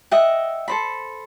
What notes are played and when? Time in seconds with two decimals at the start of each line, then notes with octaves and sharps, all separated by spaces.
0.11 D#5 E5 F#5 G5
0.68 A4 C5 B5